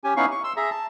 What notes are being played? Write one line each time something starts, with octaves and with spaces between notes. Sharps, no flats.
C#4 G4 G#5
B3 C#4 D#4 E4 F5 C#6
C#6
C6 E6
G#4 E5 A#5
A5